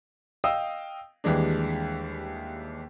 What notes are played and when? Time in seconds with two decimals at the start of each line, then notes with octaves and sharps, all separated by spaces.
0.44 D#5 F5 G5 D#6 E6
1.24 D#2 E3 G3 G#3 D4